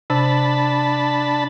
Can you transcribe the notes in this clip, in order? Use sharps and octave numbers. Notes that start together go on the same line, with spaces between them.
C3 D4 A5 B5